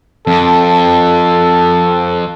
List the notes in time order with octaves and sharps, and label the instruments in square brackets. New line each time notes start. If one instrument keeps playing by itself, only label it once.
[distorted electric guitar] F2 [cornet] A4